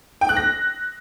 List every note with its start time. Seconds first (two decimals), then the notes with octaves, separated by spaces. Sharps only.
0.21 G5
0.29 F#6
0.37 A#6